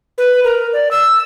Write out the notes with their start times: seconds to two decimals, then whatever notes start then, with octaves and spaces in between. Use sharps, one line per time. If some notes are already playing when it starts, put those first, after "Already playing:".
0.18 B4
0.44 A#4
0.73 D5
0.91 E6